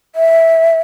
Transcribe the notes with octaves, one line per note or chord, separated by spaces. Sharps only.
E5